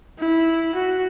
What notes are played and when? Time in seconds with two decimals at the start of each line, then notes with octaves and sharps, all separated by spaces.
0.19 E4
0.75 F#4